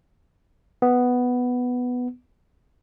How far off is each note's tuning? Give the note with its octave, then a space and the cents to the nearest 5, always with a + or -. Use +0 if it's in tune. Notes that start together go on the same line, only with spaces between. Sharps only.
B3 +5